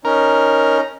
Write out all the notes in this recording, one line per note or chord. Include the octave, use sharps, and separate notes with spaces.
C#4 D#4 A#4